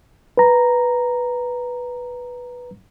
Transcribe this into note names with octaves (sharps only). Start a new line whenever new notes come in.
B4 A#5